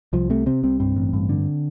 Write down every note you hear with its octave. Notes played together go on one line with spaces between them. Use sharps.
C2 F3
C3 A3
C3 C4
C2 C4
G2 C4
A1
G2
D3